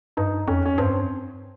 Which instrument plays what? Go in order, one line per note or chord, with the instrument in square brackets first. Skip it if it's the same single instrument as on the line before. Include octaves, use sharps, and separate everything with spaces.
[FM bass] G2 [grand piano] D#4
[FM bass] F2 [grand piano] C#4
[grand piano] C#4
[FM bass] G2 [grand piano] C4